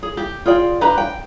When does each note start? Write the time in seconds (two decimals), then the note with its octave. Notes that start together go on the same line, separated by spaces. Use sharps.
0.03 G#4
0.17 G4
0.46 F4 G#4 D5 G5
0.81 D4 G4 B4 A#5
0.98 G5